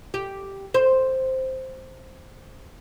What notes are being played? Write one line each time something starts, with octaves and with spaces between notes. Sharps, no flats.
G4
C5